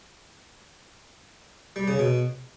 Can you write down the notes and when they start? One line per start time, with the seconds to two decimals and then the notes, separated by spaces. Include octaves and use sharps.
1.76 G3
1.88 C#3
1.99 B2